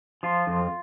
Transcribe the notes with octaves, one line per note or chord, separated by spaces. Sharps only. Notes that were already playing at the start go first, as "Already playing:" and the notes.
F3 F4
F2